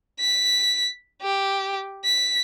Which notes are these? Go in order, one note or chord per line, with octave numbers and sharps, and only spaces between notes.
B6
G4
B6